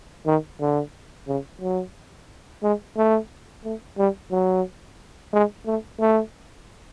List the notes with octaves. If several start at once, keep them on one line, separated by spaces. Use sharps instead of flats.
D#3
D3
C#3
F#3
G#3
A3
A3
G3
F#3
G#3
A3
A3